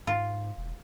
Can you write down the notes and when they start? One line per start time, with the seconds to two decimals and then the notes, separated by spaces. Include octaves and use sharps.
0.07 G#2 F4
0.57 E1